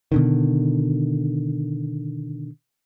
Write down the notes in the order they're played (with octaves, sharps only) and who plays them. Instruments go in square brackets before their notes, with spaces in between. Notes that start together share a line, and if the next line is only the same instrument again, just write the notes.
[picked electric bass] B2 D3 D#3